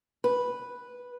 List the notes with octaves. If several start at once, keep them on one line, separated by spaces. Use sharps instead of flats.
B4